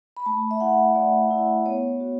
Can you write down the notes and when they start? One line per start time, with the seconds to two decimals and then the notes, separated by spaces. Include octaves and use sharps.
0.17 B5
0.26 A3 A5
0.51 E5
0.60 E4 F#5
0.95 A3 D5
1.31 E4
1.66 B3 C#5
2.00 F#4